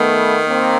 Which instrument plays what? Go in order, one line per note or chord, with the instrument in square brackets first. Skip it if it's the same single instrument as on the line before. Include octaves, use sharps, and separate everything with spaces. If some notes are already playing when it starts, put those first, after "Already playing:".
Already playing: [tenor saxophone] D#3 [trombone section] A3 B3
[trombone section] A#3 C4